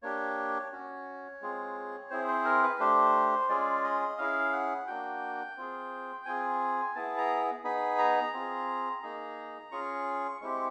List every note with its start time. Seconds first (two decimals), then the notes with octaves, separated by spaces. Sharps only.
0.02 A#3 D4 G4 C#5
0.72 C#4 F#4
1.41 G#3 C4 F4 G#4
2.10 C4 E4 G#4 C5
2.28 C5
2.45 A#4
2.63 B4
2.80 A3 D4 G4 C5
3.49 G#3 C#4 F4 G#4 D5
3.84 D#5
4.18 C#4 E4 G#4 F5
4.53 F#5
4.87 A#3 D4 F#4 G5
5.57 C4 F4 G#4
6.26 C4 F4 G#4 G#5
6.95 B3 E4 G#4 A5
7.18 A#5
7.64 B3 D#4 G#4 B5
7.99 A#5
8.33 C4 F4 G#4
9.03 A#3 D#4 G#4
9.72 C#4 F4 G#4 C#6
10.41 G#3 C4 E4 G4 C#6